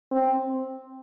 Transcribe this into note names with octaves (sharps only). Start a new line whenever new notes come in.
C4